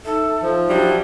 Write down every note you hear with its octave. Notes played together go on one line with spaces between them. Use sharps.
D#4 A4 E5
F3
F#3 G3 D4 D5